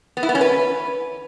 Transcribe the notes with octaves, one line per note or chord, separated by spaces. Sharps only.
B3
E4
B3
C#4
B4